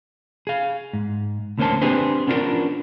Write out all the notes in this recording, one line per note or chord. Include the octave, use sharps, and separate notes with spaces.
G#4 F5
G#2
D2 D3 A#3 C#4 C5 A5
C4 D4 G4 G#4 B4 C5
B3 C#4 D4 F4 F#4 A#4